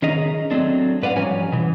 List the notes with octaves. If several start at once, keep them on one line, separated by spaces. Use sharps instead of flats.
D#3 C#4 G#4 D#5 A#5
F#3 A3 C4 D4
G#2 B4 D5 F5 F#5
F3 G3 C#4 C#5 G#5 A#5
B2 E3